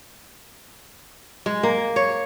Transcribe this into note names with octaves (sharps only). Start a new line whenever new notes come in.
G#3
A#3
C#5